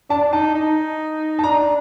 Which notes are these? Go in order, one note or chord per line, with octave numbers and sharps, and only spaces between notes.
D4 A5
D#4 A5
D#4
A5
D4 A#5